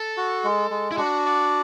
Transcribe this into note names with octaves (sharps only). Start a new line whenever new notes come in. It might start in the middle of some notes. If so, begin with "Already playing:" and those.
Already playing: A4
F#4
G#3
G#3
E4
D4 F#4
D5